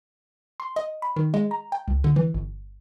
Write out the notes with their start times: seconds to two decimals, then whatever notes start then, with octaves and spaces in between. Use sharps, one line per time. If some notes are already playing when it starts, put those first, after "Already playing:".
0.60 C6
0.76 D#5
1.02 B5
1.16 D#3
1.34 G#3
1.51 A#5
1.72 G5
1.88 C#2
2.04 D3
2.16 E3
2.34 G1